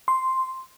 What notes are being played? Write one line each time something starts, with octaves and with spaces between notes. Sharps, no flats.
C6